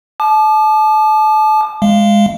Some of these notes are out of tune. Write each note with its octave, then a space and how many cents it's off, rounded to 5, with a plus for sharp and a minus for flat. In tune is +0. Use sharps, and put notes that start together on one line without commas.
A5 -30 D6 +40
G#3 -5 F5 -15